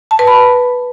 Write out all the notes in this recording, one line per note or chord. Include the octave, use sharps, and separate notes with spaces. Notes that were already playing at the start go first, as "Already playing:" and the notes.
A5
B4
B5